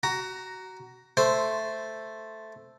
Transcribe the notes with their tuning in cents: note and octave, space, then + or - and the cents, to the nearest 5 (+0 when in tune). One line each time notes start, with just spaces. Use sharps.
F#4 +20 A#5 +0
A3 +0 C5 +0 C6 -15